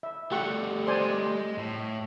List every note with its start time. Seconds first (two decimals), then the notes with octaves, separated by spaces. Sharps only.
0.03 E5
0.32 G3 A3 G4 F#5 C#6
0.87 C5 D5 D#5 G#5 C6
1.58 A2